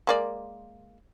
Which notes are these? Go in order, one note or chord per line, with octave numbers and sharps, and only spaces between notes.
G#3 A#3 D5